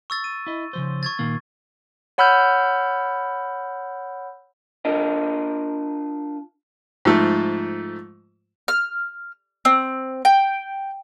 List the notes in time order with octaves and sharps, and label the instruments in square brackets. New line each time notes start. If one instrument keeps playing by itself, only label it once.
[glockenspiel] C#6 E6 A6
D#7
[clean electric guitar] E4 D#5
C#3 F3 C5
[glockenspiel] C#6 G#6 A6
[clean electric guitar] A#2 D#3 A#3
[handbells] C#5 F#5 B5 E6 F6 G6
[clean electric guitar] D4 F4 A#4 D#5
[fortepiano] G#2 F3 A3
[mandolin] F6
C4
G5